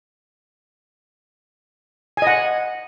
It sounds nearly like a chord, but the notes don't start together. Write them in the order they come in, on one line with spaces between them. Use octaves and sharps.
G#5 D#5 F#5